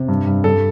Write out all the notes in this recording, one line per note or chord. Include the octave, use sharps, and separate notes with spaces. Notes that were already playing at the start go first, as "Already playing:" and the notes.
Already playing: C3
G2
G2
G2 A4